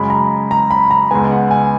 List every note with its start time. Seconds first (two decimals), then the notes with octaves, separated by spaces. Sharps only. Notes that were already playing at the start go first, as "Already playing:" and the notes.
Already playing: F#2 C#3 G#3 C#4 B5
0.10 A#5
0.51 A#5
0.71 B5
0.91 A#5
1.11 C#2 C#3 G#3 B3 G#5
1.31 F#5
1.51 G#5